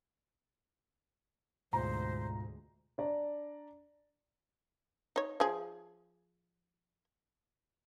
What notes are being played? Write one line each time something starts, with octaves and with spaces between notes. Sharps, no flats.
D2 G#2 B2 G#3 F4 C5 A#5
D4 D5 A#5
D#4 C#5
F3 G#4